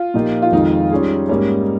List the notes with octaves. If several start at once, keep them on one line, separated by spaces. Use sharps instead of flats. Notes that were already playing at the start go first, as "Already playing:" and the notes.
Already playing: F4
A#2 F3 A#3 D#4 G4
F4
F2 D#3 G#3 D#4
G3 C#4 F4 G#4
G#2 G3 A#3 C#4